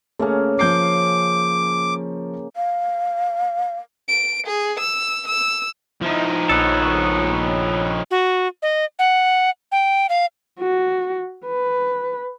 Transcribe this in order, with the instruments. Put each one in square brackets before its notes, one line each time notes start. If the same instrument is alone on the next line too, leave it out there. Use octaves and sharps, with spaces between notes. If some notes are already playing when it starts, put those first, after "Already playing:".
[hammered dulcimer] C#3 A#3 C#4 [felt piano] A3 G#4
[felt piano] F3 G6 C7 [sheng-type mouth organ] D6
[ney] F5
[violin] D7
G#4
E6
E6
[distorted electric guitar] F3 D#4 [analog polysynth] E4
[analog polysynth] A#1 C#5 [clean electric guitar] B3 A4
[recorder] F#4
D#5
F#5
G5
F5
[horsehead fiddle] F#4
B4